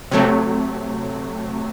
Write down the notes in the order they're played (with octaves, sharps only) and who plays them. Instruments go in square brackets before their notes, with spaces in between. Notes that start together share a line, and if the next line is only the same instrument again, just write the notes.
[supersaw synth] C3 F#3 A3